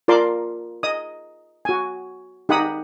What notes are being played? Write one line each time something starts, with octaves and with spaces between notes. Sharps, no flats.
F4 A#4 D5 A5 C6 D6
D#5 D#6
F#4 G#5
D#4 G4 F#5 B5 D#6